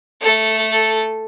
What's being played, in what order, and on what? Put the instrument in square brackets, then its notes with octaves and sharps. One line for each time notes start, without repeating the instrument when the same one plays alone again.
[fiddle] A3 A4